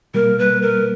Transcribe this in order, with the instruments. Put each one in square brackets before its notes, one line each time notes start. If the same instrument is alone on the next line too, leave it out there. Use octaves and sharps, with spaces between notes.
[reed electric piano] B2 G3 A#3 [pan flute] A#4
[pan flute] B4
A#4